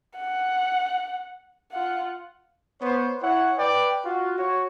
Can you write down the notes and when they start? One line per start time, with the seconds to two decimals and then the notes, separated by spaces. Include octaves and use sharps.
0.19 F#5
1.72 F4 F#5
2.81 B3 C5 C#5
3.22 E4 C#5 F#5
3.58 B4 D5 G5
4.05 F4 F#4
4.38 F#4 C#5